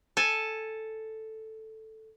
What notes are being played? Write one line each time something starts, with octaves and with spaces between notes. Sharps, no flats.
A4 G#5 A5